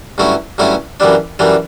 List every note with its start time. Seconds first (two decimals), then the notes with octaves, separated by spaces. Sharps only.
0.18 G2 F#3 A3 C#4 E4
0.58 G2 F#3 A3 C#4 E4
1.00 F#2 E3 G3 D4
1.39 F#2 E3 G3 D4